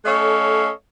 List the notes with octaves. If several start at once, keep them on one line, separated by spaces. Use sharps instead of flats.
A3 C#4 A4 C#5 D#5 F5